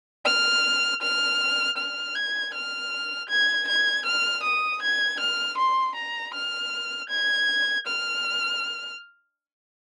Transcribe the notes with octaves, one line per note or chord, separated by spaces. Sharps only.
F6
F6
F6
G#6
F6
G#6
G#6
F6
D#6
G#6
F6
C6
A#5
F6
G#6
F6